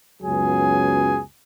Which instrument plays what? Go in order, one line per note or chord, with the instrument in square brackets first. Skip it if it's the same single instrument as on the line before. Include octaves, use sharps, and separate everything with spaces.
[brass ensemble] C#2 F#2 F#3 B3 G#4 G#5